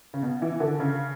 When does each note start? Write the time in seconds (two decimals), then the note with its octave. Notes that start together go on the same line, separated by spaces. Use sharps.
0.14 C#3
0.22 B2
0.42 E3
0.60 D3
0.80 C#3